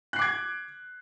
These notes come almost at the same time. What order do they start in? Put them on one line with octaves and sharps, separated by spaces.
F#6 C7 D6 G#6